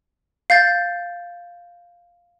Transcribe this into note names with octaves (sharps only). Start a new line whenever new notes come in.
F5 G6 A6